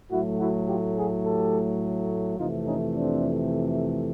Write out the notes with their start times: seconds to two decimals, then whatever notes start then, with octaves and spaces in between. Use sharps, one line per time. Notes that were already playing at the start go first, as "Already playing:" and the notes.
0.10 A2 F#3 A3 E4 F#4
0.39 E4 F#4
0.67 F4 G4
0.97 F#4 G#4
1.24 G4 A4
2.37 F2 C3 E3 A3 D#4 F4
2.66 C#4 D#4
2.94 C4 D4